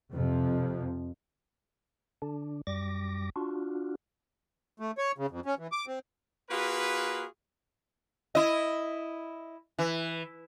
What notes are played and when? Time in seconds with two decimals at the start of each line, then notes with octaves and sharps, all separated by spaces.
0.14 F2 C3 F3
2.22 D3 D4
2.67 F#2 G3 D6 A#6
3.36 D4 F4 F#4
4.80 A3
4.98 C#5
5.18 C#3
5.30 F2
5.46 C#4
5.59 E3
5.72 D6
5.87 C4
6.50 A#3 F4 F#4 G#4 B4
8.35 E4 D#5
9.79 E3